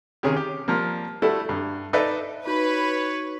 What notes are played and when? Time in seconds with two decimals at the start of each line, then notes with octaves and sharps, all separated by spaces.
0.23 C3 D#3 C#4 G#4
0.37 G4
0.68 F3 G3 A#3
1.22 G3 A3 E4 F#4 A4
1.49 G2
1.93 D#4 A4 B4 D5 E5
2.47 D#4 F#4 B4 C#5 B5 G6